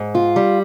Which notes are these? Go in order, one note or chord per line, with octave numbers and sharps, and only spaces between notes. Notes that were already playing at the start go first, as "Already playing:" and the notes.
Already playing: G#2
F4
G3